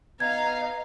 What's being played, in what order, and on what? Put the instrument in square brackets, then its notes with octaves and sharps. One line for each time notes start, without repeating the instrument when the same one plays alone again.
[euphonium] B3 [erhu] D#4 [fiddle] F5 A#5 [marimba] G#6